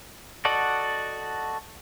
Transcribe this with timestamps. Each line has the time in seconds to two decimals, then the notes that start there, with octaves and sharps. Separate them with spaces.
0.45 F#4 A4 D5 D#5 F#5